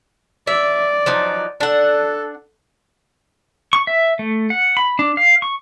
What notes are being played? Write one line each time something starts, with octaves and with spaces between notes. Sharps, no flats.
D5 E5
F3 F#3 D#4
D4 A4 F#5
C#6
E5
A3
F#5
B5
D4
F5
C#6